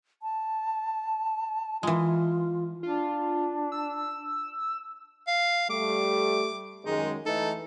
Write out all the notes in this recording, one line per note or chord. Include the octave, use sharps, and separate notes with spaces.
A5
E3 G#3 F4
D4 F4
E6
F5
G3 A3 D6
F#2 D#3 G#3 D#4
E3 A3 D#4 A4